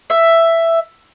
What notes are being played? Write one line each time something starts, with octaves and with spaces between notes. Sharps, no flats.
E5